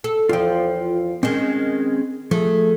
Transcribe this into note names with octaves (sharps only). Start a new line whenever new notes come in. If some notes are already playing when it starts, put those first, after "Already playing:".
A4
E2 F3 F4 G5
D#3 G#3 C4 C#4
F3 A3 G#4